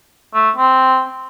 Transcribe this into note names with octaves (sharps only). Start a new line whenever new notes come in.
A3
C4